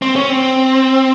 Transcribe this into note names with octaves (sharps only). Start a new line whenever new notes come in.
C4
C#4
C4